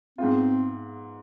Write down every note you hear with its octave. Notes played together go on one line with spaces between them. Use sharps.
G#2 G#3 B3 C4 F4